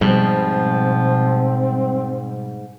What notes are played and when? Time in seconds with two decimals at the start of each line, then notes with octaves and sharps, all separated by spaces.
0.01 G#2 B2 F3 G3 C4